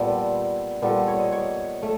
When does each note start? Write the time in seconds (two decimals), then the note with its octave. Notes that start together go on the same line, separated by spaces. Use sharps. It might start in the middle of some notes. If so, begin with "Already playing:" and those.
Already playing: A#2 G3 B3 A4
0.82 A#2 G3 B3 A4
1.08 C#5
1.19 D#5
1.32 C#5
1.83 A3